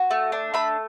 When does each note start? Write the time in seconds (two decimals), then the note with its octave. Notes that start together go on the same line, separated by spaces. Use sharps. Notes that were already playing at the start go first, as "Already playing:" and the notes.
Already playing: F#4
0.11 A3
0.32 D4
0.54 A3 B5